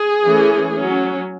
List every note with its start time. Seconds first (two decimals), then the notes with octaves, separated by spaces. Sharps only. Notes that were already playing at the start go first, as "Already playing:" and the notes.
Already playing: G#4
0.24 E3 A3 C#4
0.76 F#3 C#4